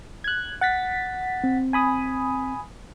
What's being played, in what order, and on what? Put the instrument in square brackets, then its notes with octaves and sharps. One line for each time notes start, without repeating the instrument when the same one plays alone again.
[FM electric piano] F#6 G#6
F#5 A6 B6
[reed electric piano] C4
[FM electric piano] G#5 B5 D#6